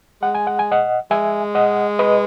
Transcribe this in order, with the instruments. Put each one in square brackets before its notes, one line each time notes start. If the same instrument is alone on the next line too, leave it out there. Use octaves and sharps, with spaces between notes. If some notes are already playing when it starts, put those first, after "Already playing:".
[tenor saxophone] G#3 [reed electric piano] F#5
[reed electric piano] G#5
F#5
G#5
D#5 F#5
[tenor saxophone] G#3 [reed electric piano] E5 G#5
[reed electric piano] D#5 F#5
B4 D#5